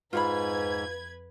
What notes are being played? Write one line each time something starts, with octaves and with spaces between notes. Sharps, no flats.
F2 G#2 F4 B4 F#5 B5 G#6